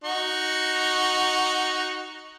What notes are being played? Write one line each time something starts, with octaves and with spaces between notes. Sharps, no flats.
D#4 F#4 C#6